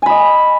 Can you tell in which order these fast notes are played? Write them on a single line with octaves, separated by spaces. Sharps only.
G#5 B5 D#5